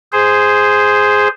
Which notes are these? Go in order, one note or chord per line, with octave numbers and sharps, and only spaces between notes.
G#4 C5